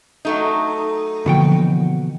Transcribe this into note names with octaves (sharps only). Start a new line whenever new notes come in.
F#3 A3 D#4
B2 D3 E3 F3 A#3 F#4 G5